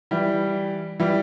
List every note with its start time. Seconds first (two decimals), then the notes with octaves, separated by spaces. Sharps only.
0.11 E3 G3
1.00 E3 G3